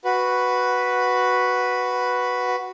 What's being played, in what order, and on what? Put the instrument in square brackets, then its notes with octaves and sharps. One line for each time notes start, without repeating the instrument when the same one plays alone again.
[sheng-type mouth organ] F#4 B4